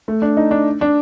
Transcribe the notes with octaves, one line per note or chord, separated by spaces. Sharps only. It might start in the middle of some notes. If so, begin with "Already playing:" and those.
A3
D4
D#4
D4
D4